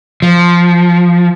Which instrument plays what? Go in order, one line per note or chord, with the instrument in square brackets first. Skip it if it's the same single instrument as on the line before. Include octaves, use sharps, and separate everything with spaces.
[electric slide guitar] F3